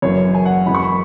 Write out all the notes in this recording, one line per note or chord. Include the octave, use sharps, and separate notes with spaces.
F#1 F#2 E3 C#5
G#5
F#5
F#2 E3 G#3 B5
C#6
B5